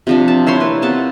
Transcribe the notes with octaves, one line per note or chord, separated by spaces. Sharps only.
C3 F3 D4
A5
E4 C5 C#5 C6
A#3 B4
C3 B3 A5